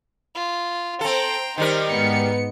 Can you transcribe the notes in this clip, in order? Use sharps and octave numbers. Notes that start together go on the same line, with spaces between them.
F4
C4 A4 C5 G5 A#5
D#3 G3 D#4 A#4
G#2 B3 C#7